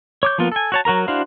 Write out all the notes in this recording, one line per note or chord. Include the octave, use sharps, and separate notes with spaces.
C#5 D6 G6
F3 A#3 B3 F4
A4 G#5
F#4 C#5 A5
F#3 F#4 A#4 A#5
D4 E4 F#4 C5 F5